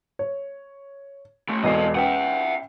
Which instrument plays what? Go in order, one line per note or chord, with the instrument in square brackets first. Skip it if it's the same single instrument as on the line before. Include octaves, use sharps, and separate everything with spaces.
[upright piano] C#5
[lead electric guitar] E3 A3
[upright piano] E1 E2 C7 [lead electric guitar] A4 D#5
[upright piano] C#4 B4 G5 [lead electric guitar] E5 F#5